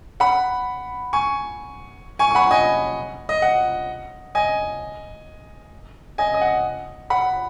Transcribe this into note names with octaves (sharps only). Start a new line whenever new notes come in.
F#5 B5
G#5 C#6
G#5 C#6
C#6
F#5 B5
D#5 G#5
D#5
F#5
D#5 G#5
D#5 G#5
D#5
F#5
F#5 B5